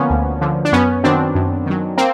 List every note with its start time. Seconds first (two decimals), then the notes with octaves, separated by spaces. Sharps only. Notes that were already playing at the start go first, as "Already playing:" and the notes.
Already playing: D3 F3 A#3 B3 C#4
0.10 D2
0.41 D3 F3
0.65 D4
0.72 F#2 B3 C#4
1.04 D#3 F#3 C4 D4
1.35 F#2
1.66 D#3 F#3
1.98 A#3 C4